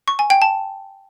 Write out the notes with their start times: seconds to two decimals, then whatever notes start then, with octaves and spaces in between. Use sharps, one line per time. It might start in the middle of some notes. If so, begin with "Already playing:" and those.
0.08 C#6
0.19 G#5
0.30 G5
0.42 A5